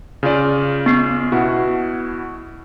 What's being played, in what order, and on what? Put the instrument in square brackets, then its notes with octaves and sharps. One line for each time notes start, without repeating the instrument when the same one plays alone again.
[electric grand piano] C#3 F4 D5
[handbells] B3 C7
[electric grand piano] B2 E4 F#4